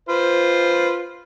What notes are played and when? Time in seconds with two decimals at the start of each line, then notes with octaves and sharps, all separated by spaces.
0.09 F4 B4 C5